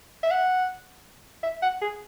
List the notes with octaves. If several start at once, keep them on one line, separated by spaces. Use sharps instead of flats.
E5
F#5
E5
F#5
G#4